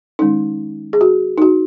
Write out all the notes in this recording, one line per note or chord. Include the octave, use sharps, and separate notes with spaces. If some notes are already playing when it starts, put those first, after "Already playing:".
D#3 G#3 C#4 D#4
G#4
F#4
D#4
F#4